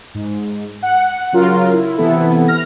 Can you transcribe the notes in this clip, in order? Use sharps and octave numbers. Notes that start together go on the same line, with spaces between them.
G#2
F#5
C#3 F#3 F4 A#4
E4
C3 E3 B3 E4 A4
F6 A#6